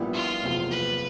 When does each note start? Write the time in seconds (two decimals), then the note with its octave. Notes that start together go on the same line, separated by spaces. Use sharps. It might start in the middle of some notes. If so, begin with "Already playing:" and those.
Already playing: A#1 A#2 G3 B3 E4
0.14 F4
0.42 F#1 E2 C3 F3
0.71 B4